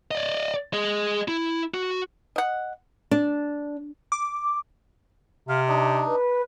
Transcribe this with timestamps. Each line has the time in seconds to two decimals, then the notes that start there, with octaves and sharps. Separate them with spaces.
0.11 D5 D#5
0.73 G#4 D#5
1.28 E4
1.74 F#4
2.36 D#5 F#5
3.11 D4
4.12 D6
5.49 C3 F5
5.68 D4 D#4
6.07 B4